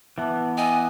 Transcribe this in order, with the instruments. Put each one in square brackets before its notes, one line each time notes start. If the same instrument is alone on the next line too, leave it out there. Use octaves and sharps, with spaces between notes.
[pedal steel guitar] E3 B3 [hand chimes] E5 A5 D6
[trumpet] D#5 [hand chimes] G5 D6 E6 [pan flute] G#5